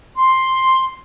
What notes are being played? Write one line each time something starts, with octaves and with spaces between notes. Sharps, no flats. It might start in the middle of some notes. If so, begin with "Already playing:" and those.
C6